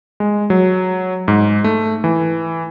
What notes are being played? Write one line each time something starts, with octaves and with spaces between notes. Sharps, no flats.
G#3
F#3
G#2
A3
E3